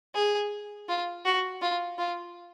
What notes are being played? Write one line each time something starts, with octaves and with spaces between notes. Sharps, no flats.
G#4
F4
F#4
F4
F4